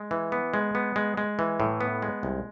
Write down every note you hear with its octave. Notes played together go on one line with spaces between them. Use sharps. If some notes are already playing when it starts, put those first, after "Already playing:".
Already playing: G#3
E3
B3
G#3
B3
G#3
G#3
E3
A2
B3
G#3
C2